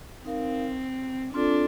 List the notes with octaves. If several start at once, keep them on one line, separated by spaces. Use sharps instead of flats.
C4 D#4 A#4 F5
C4 D4 F4 A4 D5